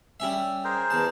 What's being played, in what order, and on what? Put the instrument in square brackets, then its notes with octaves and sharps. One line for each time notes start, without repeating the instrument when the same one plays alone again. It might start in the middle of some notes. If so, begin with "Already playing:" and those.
[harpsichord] G3 C#4 E5
[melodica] G#4 A#4 C5
[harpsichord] E2 A5